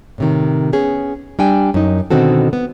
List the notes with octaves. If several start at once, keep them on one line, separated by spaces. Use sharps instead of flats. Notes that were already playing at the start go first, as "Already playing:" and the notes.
A2 C3 D#3
B3 C#4 G#4
G3 D4 G5 G#5
F#2 D#4
B2 D3 D#3 C4 F#4 A4
B3